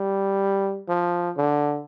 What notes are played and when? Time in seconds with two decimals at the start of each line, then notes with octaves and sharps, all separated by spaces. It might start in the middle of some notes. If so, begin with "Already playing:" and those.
Already playing: G3
0.88 F3
1.37 D3